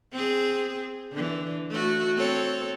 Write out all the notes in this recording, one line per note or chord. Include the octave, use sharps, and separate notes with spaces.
C4 G#4
D3 E3
A3 F#4
C4 A4 C#5